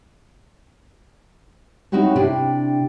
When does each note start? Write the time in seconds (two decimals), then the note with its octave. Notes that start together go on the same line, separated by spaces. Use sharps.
1.92 C4 D#4 E4 F#4 G4 C#5
2.16 C3 D4 E4 G4